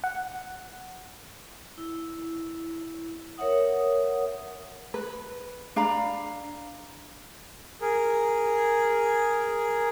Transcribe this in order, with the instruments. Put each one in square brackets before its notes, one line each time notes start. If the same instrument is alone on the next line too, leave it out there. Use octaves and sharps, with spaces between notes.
[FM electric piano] F#5
[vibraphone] E4
A#4 C#5 E5 F#5 D#6
[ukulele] B4
D4 F5 A#5 B5
[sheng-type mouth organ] G#4 A#4